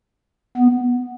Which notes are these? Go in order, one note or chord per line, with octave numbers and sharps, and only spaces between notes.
B3